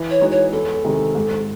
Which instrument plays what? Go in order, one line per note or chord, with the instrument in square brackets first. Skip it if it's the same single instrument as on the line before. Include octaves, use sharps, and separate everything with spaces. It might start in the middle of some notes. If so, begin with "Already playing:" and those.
Already playing: [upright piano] E3
[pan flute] C#5
[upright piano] G#3 D#4 F#4
[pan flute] C#5
[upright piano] E2 [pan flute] A4
[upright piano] C3 D#3 G#3
G#2